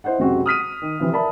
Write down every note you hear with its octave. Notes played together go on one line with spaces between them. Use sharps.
E4 C5 D#5 F#5
F#1 C#2 C3 C4 F#4
D#6 F6 B6 D#7
D#3
C3 E3 F3 C4 E4
A#4 D5 E5 A5 B5